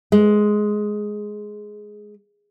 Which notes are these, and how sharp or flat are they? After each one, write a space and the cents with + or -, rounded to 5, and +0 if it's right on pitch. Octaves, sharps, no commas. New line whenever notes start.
G#3 +10